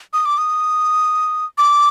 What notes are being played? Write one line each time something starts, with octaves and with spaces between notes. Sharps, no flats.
D#6
D6
D#6
D6